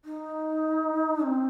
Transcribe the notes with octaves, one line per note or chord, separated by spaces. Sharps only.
D#4
C4